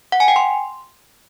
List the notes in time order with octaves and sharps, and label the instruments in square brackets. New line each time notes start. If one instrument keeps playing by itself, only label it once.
[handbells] F#5
G#5
G5
C6